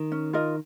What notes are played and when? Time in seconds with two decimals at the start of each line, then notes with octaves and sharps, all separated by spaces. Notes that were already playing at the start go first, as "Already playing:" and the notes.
Already playing: D#3
0.12 C#4
0.33 F4 A#4 D#5